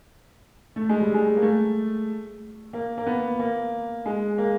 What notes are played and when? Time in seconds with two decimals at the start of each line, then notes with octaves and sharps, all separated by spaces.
0.76 A3
0.89 G#3
1.01 G3
1.14 G#3
1.37 A#3
1.42 A3
2.73 A#3
2.97 A#3
3.07 B3
3.39 A#3
4.06 G#3
4.38 A#3